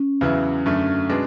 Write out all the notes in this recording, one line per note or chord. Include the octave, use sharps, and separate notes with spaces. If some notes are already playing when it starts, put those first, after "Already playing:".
Already playing: C#4
E2 C#3 F#3 B3 E4
F#2 D3 A3
B2 G#3 B3 D4